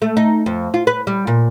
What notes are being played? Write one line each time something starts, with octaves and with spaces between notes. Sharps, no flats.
A3
D#4
F2
F4
B4
G3
A#2